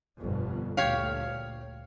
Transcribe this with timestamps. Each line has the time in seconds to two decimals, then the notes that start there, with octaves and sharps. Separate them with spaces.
0.19 G1 F2 B2
0.77 D2 A#2 G4 C#5 F5